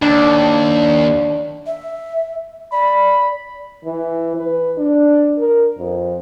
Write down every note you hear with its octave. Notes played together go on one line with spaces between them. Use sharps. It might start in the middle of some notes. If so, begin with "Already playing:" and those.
D#2 D4
E5
D5 B5
E3
B4
D4
A#4
F2